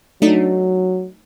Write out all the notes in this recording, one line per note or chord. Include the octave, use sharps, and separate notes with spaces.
F#3 A3 D4 D#4